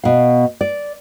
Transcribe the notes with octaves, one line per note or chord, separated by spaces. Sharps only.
B2 F5
D5